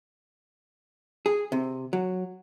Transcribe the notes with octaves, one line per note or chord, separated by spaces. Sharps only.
G#4
C3
F#3